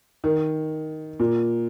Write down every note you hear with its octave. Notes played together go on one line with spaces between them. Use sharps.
D#3
A#2